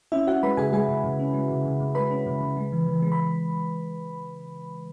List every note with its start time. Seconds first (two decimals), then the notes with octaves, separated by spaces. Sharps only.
0.12 C#4 E4 E5
0.27 C#4 F#4 F#5
0.43 G#3 B4 B5
0.57 C#3 G#4 G#5
0.73 G#3 G#4 G#5
0.89 C#3
1.04 C#3
1.19 C#4
1.34 G#3
1.50 C#3
1.65 C#3
1.80 C#3
1.95 G#3 B4 B5
2.11 C#4
2.27 C#3
2.41 C#3
2.57 G#3
2.72 E3
2.87 E3
3.02 G#3
3.12 B5